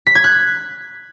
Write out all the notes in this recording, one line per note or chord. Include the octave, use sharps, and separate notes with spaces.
B6
G#6
F#6